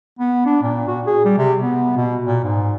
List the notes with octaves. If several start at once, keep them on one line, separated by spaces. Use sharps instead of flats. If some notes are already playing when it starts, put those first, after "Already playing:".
B3
D4
A#2
F#4
G#4
G3
C3
B3
B2
A#2
G#2